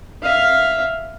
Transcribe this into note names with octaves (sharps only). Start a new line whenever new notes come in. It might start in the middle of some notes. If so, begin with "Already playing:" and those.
E5 F5